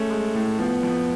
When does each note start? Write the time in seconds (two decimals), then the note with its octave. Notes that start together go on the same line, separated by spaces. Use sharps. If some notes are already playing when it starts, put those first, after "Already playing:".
Already playing: G#3 A3 C#4
0.10 G#3
0.34 A2
0.59 F3 B3
0.83 F2